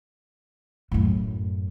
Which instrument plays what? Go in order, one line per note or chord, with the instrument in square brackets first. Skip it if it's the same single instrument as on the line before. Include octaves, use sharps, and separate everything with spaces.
[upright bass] F#2 A2